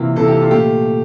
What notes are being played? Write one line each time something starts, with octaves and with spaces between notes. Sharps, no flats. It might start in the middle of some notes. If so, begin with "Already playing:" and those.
Already playing: C3 E3 A#3 F4
C3 E3 A#3 A4
G4
F4
A#2 A3 G4